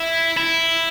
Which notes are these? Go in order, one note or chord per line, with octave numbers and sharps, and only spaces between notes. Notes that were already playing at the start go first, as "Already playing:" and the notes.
Already playing: E4
E4